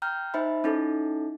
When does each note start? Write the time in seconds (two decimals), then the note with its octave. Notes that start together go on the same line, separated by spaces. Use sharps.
0.02 G5 A#5 F6 G6
0.34 D#4 C5 E5 B5
0.64 C#4 D#4 E4 A4